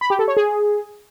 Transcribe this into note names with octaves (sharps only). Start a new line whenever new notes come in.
B5
G4
A4
C#5
G#4